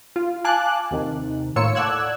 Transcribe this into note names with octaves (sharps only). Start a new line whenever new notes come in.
F4
F5 G#5 A5 D6 F#6
D#2 C3 D#3
A2 A#3 F4 C#5 E6 C#7
A4 D5 F#5 E6 F#6 G#6